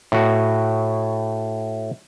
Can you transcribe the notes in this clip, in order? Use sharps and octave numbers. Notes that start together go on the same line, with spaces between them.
A2 F#4